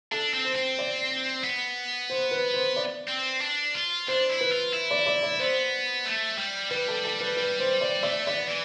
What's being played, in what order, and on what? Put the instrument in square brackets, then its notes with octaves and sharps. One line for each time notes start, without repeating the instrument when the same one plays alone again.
[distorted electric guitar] D4 [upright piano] A4
[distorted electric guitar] C4
[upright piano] C5
[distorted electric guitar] C4
[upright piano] D5
[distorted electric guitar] B3
[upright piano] C5
B4
C5
D5
[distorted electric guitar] C4
D4
F4
[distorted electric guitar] D4 [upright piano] C5
[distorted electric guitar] E4
[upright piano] B4
[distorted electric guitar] F4
E4
[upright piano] D5
D5
D5
[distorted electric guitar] B3 [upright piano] C5
[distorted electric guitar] A3
G3
[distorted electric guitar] G3 [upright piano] B4
[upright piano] A4
A4
B4
B4
C5
D5
[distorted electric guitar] A3 [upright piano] D5
[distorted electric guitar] B3 [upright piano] D5
[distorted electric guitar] E3